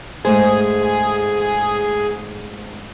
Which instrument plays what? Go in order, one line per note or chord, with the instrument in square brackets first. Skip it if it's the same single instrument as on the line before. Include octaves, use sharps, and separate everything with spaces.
[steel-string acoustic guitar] G#2 A3 C5 [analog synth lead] G#4